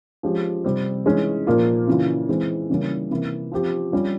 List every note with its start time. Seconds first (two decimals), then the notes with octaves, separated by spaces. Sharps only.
0.23 F3 G#3 C#4 G4
0.64 C3 G3 C4
1.06 E3 G#3 C#4
1.47 A#2 F3 A#3 F4
1.87 C#3 E3 A#3 F4
2.29 E3 G#3 C4
2.70 C#3 E3 G3 A#3 C#4
3.10 C3 E3 A#3 E4
3.52 F3 C4 G4
3.92 G3 C#4 F4